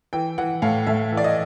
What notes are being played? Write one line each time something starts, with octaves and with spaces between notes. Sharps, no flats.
E3 G5
E3 F#5
A2 F5
A2 E5
E3
D5
D#5